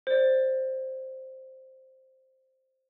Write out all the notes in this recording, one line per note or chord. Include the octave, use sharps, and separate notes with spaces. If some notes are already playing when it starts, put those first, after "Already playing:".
C5 D5